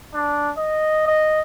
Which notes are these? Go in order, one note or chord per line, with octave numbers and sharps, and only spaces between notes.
D4
D#5
D#5